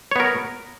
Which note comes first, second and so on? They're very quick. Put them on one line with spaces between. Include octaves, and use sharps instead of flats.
C#5 B3 A#4